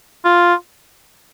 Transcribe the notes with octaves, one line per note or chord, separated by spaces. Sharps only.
F4